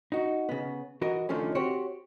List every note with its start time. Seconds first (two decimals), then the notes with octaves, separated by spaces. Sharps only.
0.12 D#4 F#4
0.49 C#3 B3
1.01 E3 F#4 A#4 D#5
1.29 C#2 D3 D#3 F3 A3 C#4
1.55 C4 F#4 G4 C5 C#5